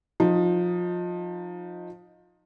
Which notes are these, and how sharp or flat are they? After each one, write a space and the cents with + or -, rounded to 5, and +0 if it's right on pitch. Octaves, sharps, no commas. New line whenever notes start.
F3 +25 D#4 +0